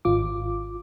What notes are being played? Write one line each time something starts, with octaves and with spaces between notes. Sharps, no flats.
G#1 F4 D6